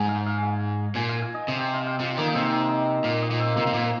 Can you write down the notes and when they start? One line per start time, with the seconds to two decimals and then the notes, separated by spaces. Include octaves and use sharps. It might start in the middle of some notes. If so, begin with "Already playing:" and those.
Already playing: G#2 G#5
0.09 F5
0.26 F5
0.38 G#5
0.43 F5
0.95 A#2 G#5
1.09 F5
1.22 F5
1.34 D#5
1.48 C3 D#5
1.60 C5
1.74 F5
1.87 F5
1.99 C3 F4
2.17 D#3 A#3
2.28 D#4
2.34 C3 C4
2.69 D#5
3.04 A#2 F5
3.22 D#5
3.31 A#2
3.39 C4
3.56 C3 A#3
3.67 C3
3.73 A#2 A#3